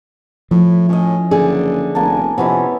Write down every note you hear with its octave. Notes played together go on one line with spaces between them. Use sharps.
A2 F3 E4
A2 C#4 D#5
F#1 D3 G#4
F1 A#3 G#5 A5
F2 C3 B3 C#4 D#4 E4